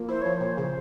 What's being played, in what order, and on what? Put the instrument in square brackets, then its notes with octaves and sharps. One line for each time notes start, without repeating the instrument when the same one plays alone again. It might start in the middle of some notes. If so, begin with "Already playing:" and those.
Already playing: [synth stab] F3 A#3
[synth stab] E4 [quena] C5
[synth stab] F3 [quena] C#5
[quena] C5
[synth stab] A#2
C#3